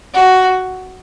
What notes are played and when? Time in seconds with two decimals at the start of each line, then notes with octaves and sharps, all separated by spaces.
0.14 F#4